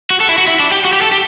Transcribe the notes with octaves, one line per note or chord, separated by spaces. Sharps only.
F#4
A4
E4
F#4
E4
D4
G4
F#4
G4
A4
G4